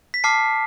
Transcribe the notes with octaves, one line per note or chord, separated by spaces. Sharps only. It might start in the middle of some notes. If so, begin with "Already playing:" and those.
B6
A5 D6 F6 C7